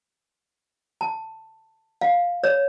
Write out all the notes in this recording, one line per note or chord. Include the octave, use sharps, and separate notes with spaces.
A5
F5
C#5